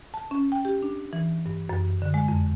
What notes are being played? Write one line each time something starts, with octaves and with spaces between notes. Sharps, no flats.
A5
C#4
G5
G4
D4
E3
G2
F#2
D3
G#3
F2